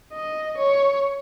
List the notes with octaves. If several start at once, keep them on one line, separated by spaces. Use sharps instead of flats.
D#5
C#5